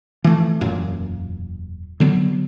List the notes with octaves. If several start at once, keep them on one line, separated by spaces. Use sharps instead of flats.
E3 A3
E1 F#2 A#2
D3 F#3 B3